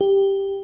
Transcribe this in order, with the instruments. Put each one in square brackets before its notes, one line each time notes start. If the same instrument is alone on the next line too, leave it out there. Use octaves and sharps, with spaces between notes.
[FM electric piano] G4